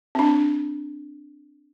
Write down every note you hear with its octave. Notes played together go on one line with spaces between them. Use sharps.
C4 D4